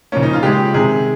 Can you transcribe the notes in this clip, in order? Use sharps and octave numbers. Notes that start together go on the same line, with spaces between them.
C#3 F3 A#3 C#4
D#4
F4
C#3 G#3 G4
C3 D#3 G#3 G#4